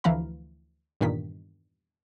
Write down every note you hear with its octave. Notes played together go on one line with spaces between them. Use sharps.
D2 E3 F3 F5 A#5 B5
E2 G2 A#2 D#3 B6